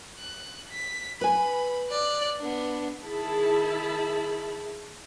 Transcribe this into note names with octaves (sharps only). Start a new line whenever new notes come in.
F#6
B6
B4 G#5 B5
D5 F#6
B3 D4
D#3 E4 G#4 A5 B5